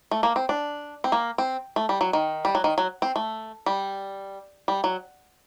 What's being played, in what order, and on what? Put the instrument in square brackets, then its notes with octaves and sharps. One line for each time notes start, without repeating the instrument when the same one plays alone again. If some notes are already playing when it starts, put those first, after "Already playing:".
[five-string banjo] A3
A#3
C4
D4
C4
A#3
C4
A3
G3
F#3
D#3
G3
F#3
D#3
F#3
C4
A3
G3
G3
F#3